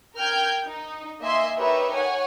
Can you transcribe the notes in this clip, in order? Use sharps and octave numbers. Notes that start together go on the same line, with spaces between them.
A#4 G5 F6 G6 G#6
D#4
A#3 D#5 E5 G#5 C6
D#4 G4 A#4 B4 C#5 E5
C#5 F#5 G#5